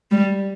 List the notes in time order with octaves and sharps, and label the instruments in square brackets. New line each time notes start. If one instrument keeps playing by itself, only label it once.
[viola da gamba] G3